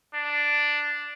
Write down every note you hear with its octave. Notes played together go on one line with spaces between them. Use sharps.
D4